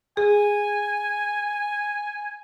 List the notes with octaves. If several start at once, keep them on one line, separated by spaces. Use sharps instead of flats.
G#4 G#5